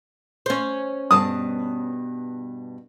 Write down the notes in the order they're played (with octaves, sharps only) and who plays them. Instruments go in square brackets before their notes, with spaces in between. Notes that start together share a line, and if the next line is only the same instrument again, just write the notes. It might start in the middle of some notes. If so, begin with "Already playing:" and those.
[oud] C#4 C5
[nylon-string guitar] G2 B2 A5 [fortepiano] D#6